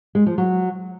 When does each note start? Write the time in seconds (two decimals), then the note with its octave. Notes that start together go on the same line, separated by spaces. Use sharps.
0.15 G#3
0.26 F3
0.38 F#3